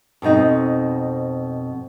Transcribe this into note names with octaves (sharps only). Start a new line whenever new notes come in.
F2 B2 C4 D#4